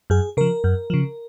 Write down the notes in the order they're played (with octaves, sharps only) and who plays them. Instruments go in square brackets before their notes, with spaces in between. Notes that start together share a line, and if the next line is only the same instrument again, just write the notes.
[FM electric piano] F#2 G#4
C#3 F3 A#4
F#2
C#3 F3